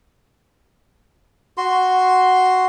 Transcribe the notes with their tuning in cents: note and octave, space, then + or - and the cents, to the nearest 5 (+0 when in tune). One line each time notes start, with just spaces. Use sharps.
F#4 +0 C6 +0